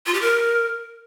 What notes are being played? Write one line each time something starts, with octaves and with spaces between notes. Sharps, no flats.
F4
G4
A#4